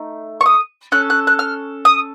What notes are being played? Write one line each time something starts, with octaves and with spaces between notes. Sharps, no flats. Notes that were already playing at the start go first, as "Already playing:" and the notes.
Already playing: A3 D#4
C#6
D#6
C#4 A4 F#6
F#6
F#6
F6
D#6